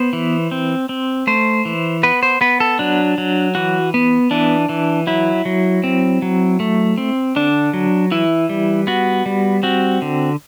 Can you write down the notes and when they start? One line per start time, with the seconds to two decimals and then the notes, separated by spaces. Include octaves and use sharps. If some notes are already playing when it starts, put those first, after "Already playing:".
Already playing: B3 C5
0.13 E3
0.51 C4
0.89 C4
1.27 A3 C5
1.65 E3
2.03 B3 B4
2.23 C5
2.41 B3 B4
2.60 A4
2.79 F#3 D4
3.18 F#3
3.55 E3 F#4
3.94 B3
4.31 E3 D4
4.69 E3
5.07 F#3 E4
5.45 F#3
5.84 C4
6.22 F#3
6.60 A3
6.98 C4
7.36 D3 D4
7.74 F#3
8.11 E3 E4
8.49 G3
8.87 B3 F#4
9.26 G3
9.63 C4 F#4
10.02 D3